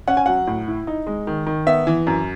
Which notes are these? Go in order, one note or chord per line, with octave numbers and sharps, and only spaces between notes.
C#4 F#5
G#5
F#3 F#5
A2
E4
D#4
G#3
D#3
D#3
B3 E5
E3
F#2